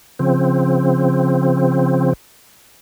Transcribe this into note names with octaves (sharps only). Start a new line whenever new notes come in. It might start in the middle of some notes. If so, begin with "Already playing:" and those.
C#3 F3 C4